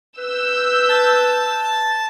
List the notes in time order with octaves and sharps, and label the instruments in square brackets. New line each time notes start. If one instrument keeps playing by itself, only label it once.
[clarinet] B4 [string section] E6 G6
[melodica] A5